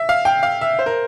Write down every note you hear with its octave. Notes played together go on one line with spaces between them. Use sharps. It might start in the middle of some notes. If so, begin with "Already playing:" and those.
Already playing: E5
F5
G5
F5
E5
C5
A#4